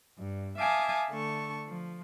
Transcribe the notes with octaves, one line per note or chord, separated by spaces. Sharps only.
G2
E5 F5 G#5 A5 D6 D#6
D3 A3 A5 C#6
F3